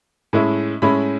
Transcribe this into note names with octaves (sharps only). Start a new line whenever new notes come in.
A2 G#3 C#4 E4
A2 G#3 C#4 E4 B5